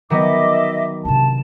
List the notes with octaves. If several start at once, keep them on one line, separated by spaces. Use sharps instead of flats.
D#3 F#3 B3 D#5 E5 D6
C3 D4 A5